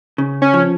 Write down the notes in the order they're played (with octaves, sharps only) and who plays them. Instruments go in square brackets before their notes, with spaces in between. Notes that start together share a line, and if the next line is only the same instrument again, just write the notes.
[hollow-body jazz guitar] C#3
[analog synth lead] C#4
[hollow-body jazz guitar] F3